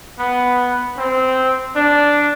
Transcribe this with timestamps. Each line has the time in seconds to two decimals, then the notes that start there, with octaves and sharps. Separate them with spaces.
0.19 B3
0.98 C4
1.76 D4